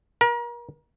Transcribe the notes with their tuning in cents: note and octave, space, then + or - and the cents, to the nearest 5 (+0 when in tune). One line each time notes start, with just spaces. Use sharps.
A#4 +35